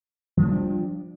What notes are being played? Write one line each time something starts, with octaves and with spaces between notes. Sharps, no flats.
F3 G3 G#3 D4